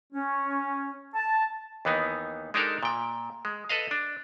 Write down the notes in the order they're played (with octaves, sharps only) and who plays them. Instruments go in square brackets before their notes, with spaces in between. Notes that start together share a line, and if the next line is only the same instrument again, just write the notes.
[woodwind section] C#4
A5
[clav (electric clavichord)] D#2 E3 B3 D#4
G#3 D4 D#4 G4 A4 A#4
A#2 G5
G#3
A4 B4 D#5 F5
D4